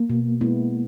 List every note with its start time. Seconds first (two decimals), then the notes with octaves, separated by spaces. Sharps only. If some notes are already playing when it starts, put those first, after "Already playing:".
Already playing: A#3
0.10 B2
0.41 G#3 B3 E4